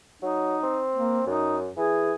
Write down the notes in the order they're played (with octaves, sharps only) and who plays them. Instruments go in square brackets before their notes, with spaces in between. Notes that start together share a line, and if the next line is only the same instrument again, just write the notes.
[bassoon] F#3 [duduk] D#4
[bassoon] C4
[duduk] A#3
[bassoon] F#2 [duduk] D#4
[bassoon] E3 [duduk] G#4